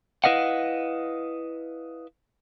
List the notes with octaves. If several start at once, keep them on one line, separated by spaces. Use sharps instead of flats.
E4 B4 D#5 F5 F#5